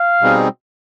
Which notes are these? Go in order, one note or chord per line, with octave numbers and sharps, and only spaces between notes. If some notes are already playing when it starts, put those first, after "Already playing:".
Already playing: F5
B2 G3 C4 D#4 G#4